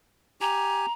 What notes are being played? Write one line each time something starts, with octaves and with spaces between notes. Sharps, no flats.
G4 G#5 A#5